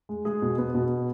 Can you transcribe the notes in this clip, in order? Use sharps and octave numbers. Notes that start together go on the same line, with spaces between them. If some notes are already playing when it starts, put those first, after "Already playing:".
G#3
G#3 G#4
B2
B3
B2